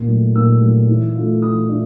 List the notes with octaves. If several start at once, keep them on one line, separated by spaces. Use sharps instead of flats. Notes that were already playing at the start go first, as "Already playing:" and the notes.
Already playing: A#2
F#3 A3
A#2 E6
F#3 A3
E3
A3 D4 F4
E3 D#6
A3 D4 F4